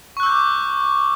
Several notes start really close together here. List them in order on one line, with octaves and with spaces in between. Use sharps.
C#6 F#6 E6 G6 D6